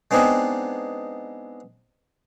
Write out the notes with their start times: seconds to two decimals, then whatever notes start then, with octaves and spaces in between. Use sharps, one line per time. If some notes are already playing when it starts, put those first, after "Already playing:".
0.11 G#3 B3 C4 D4 D#4 G#4